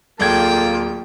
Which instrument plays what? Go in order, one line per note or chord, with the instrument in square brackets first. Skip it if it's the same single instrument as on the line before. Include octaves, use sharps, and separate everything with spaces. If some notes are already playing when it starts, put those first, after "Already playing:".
[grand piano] D1 D5 G#6 [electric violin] A#3 F4 [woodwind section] A4 A5 [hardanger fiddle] G5